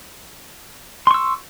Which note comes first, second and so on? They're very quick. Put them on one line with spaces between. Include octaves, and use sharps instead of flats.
C6 C#6 E6